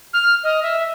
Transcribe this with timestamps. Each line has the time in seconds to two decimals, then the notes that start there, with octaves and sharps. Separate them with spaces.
0.13 F6
0.43 D#5
0.63 E5